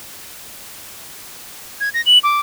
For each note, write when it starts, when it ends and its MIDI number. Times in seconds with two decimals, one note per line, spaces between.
1.80 1.89 92
1.94 2.01 94
2.06 2.18 102
2.23 2.40 86